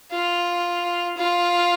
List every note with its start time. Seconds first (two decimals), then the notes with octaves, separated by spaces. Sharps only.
0.12 F4
1.17 F4